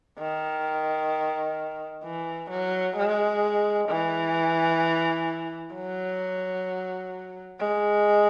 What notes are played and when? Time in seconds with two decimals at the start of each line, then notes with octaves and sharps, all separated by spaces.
0.19 D#3
2.04 E3
2.51 F#3
2.97 G#3
3.89 E3
5.74 F#3
7.59 G#3